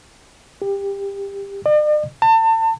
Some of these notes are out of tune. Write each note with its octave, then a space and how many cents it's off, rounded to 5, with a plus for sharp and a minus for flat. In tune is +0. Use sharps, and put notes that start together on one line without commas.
G4 +20
D5 +45
A5 +35